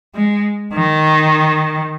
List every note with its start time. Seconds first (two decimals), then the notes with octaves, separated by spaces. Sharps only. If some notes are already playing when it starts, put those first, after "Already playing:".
0.15 G#3
0.74 D#3